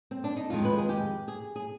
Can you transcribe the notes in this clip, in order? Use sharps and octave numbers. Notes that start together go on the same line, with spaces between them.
C4
D4
D#4
F2 D#3 G#3 F4
B4
G#4
G4
G#4
G#4